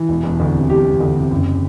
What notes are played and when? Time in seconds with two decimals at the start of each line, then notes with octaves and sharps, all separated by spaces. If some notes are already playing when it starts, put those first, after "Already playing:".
Already playing: E3
0.09 E1
0.23 E1
0.40 D2
0.55 C3
0.70 E1 G4
0.85 E1
1.00 D2
1.16 C3
1.31 F#1